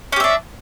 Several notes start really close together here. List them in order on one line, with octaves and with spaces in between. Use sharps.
C#4 G4 E5 D4